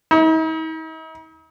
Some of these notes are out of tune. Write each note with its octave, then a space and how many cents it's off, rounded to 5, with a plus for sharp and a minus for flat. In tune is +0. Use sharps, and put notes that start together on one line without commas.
D#4 +45